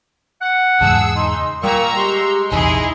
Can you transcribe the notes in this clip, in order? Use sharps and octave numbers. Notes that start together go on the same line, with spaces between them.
F#5
E2 G#2 C#3 G#4 A5 E6
D#4 C6
A#2 G3 G5 A#5 C#6 E6
G#3 G4 C6
A#1 E2 C3 D#4 E4 G#4 G#5